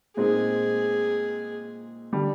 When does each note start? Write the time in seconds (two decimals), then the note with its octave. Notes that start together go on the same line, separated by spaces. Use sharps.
0.17 A#2 G#3 C4 D#4 G#4 A#4
2.13 D3 G3